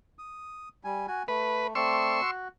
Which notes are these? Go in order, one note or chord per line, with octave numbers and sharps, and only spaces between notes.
D#6
G3 G#5
F#4 G#5
A3 B4
A3 C4 D5 C6 C#6 E6
F#4